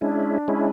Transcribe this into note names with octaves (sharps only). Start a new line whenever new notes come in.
G#3 C#4 D4 E4
G#3 C#4 E4